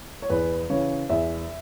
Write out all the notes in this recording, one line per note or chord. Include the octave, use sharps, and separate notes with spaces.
C#5
E2 B4
C#3 E3 C#5
E2 E5